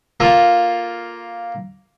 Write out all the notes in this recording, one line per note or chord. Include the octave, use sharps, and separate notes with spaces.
A#3 F4 A4